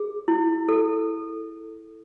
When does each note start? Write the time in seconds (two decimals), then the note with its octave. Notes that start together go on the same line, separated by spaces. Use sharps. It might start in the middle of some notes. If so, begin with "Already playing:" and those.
Already playing: G#4
0.28 E4
0.69 A4